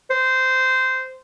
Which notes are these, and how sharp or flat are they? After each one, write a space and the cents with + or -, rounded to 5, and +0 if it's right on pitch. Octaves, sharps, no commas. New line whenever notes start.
C5 -15